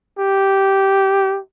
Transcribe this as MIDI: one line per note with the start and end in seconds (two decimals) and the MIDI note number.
0.19 1.39 67